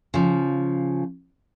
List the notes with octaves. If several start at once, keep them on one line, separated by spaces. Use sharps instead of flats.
C#3 F3